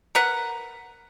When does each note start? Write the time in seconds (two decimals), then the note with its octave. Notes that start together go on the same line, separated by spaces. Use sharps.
0.15 A#4 B4 F#5